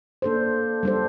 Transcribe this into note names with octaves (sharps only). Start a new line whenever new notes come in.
A#3 D4 A4 C5
G3 D4 A4 C5